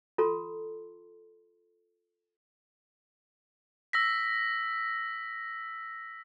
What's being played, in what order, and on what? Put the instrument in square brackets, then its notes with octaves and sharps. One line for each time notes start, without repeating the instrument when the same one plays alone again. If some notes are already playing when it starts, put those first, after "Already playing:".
[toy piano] F4 A4 A#5 C6
[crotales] E6 A#6 B6